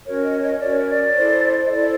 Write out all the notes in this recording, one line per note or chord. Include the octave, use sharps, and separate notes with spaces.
C#4 F#4 A#4 C#5
D#5
D#5
C#4 F#4 A#4 C#5 D5
C#5
D5
E4 A4 C5
D#5
E4 A4 C5 D5